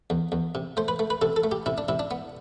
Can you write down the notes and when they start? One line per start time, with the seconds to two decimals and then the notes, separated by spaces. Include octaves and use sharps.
0.10 E2
0.32 E2
0.55 C3
0.77 A3 C5
0.88 B4
0.99 A3
1.10 B4
1.21 C3 A4
1.36 A4
1.44 A3
1.52 G4
1.66 C3 E4
1.78 D4
1.88 C3 E4
1.99 D4
2.11 B3